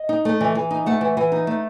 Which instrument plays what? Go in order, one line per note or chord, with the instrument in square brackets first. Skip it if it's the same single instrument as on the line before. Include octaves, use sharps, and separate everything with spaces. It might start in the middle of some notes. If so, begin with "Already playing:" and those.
Already playing: [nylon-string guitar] D#5
D#4
A3
E3
E3
D#4
A3 F#5
E3
E3
D#4
A3